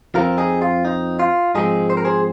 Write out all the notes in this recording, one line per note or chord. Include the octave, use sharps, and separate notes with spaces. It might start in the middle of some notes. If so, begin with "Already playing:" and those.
F2 F3 C4 F4 A#4
D#4 G#4
F4
D#4
F4
G#2 F3 G#3 C4 D#4 G#4
C5
A#4
G#4 C5